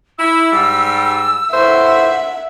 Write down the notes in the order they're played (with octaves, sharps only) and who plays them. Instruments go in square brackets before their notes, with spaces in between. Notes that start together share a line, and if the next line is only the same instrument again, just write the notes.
[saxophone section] E4 [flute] E6
[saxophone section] G#2 G3
[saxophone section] E2 A2 C5 [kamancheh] E5 F#5